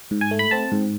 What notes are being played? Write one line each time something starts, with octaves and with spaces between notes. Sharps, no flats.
G#2
G#5
A3
B5
C4 A5
G#2